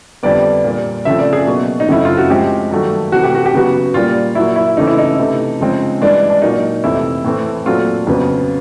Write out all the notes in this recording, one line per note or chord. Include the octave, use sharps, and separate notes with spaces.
F2 D3 G3 B3 D5
A#2 G3 A#3
C#3 F3 A3 C4 E5
D5
G#4
B2 F#3 A#3
D#4
F#2 C#3 F#3 A3 C4 E4
F4
F#4
A2 F3 G#3 C4 G4
G2 D#3 F#3 A3
C3 E3 A3 F#4
G4
F#4
G4
C#3 F#3 B3 F#4
A#2 G3 A#3 F4
A#2 F#3 A#3 E4
E4
C#3 E3 A3 C4 D#4
E4
D#4
C3 E3 A3
C#3 F3 G#3 C4
G2 E3 G#3 D4
D4
A#2 F#3 A#3 D#4
F2 C3 E3 A3 E4
A2 E3 A3 C4
A#2 F#3 A3 C4 F4
F2 C#3 F#3 B3